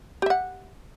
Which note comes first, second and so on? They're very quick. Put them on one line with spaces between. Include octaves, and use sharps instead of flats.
G4 E5 F#5